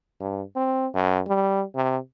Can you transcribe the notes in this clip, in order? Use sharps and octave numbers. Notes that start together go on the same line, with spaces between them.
G2
C4
F#2
G3
C3